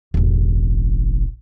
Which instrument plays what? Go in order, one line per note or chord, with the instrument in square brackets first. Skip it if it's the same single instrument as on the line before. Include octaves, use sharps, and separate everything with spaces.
[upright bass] E1 A1